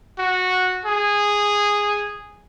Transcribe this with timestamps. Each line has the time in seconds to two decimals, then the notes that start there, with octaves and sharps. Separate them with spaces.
0.19 F#4
0.85 G#4